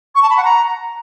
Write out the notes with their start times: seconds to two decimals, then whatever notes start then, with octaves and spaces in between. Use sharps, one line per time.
0.15 C#6
0.22 A5
0.30 B5
0.37 F#5
0.44 A#5